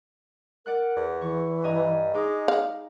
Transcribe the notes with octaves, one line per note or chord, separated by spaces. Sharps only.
A#4 D5 F#5 F#6
E2
E3 C#6
G2 D#5 G#5 A#5
G#3 D#4 G#4 D6
F5